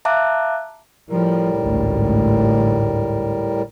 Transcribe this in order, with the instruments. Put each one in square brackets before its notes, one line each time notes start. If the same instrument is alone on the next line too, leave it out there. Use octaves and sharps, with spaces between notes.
[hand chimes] E5 F5 A5 A#5 D6 F#6
[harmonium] A2 G3 A#4 [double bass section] F3
[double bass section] A1 D2 G#2